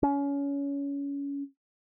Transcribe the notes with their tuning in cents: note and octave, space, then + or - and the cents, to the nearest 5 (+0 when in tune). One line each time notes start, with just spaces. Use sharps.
C#4 +25